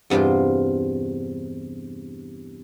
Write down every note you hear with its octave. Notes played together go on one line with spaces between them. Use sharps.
E2 G2 C3 F4 C5